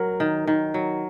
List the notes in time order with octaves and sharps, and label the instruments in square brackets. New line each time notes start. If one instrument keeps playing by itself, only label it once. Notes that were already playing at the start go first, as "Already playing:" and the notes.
Already playing: [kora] F#3 [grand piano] A#4
[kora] D#3
D#3
F#3